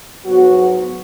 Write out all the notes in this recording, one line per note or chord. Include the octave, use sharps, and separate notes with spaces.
G#2 F#3 B3 F#4